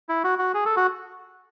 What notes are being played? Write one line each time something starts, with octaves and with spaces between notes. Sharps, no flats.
E4
F#4
F#4
G#4
A4
F#4